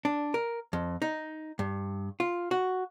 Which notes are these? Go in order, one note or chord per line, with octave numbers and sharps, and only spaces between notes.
D4
A#4
F2
D#4
G2
F4
F#4